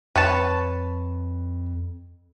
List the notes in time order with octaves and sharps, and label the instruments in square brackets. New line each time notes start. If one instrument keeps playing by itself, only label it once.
[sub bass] F2 [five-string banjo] B4 C#5 A5